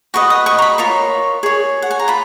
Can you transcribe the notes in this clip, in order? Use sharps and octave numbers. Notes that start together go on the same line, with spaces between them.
F#4 B4 D#5 C#6
D#6
C#6
A#5
B5
F4 A#4 C#5 C#6
G#4 C#5
F#5
G#5
A#5
F4 B5